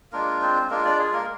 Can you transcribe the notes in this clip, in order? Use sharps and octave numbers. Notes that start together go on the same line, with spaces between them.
G#3 A#3 D4 F4 A#4
C4 C5
G#3 A#3 D4 F4 A#4
D4 D5
G#4
A#3 A#4